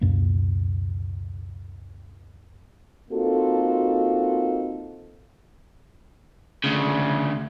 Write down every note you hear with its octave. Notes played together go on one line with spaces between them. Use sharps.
C#2 F#2 B2 A#3
A#3 C4 D#4 F4 F#4 A4
D2 C#3